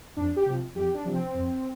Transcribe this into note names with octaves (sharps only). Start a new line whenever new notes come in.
F2 D4
G4
C3 F3
F2 G4
D4
C3 F3
C4
F2